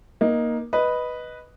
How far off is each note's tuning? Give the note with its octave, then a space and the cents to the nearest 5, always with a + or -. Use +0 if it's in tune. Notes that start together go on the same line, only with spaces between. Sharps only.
A#3 +15 D#4 +0
B4 +0 D#5 +0